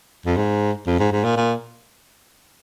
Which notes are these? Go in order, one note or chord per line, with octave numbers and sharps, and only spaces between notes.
F2
G#2
F2
G#2
G#2
A#2
A#2